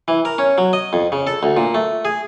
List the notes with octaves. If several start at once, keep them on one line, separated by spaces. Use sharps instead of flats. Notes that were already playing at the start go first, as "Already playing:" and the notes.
E3
A#4
C#4
F#3
D#5
F2
C#3
A4
D2
A#2
A3
G#4